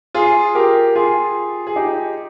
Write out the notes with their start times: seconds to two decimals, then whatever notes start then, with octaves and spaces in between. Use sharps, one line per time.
0.15 F4 G#4
0.55 G4 A#4
0.95 F4 G#4
1.67 G#4
1.76 D#4 G4